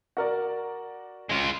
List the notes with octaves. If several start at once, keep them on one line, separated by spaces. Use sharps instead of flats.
F#4 A#4 D5
G#3 F4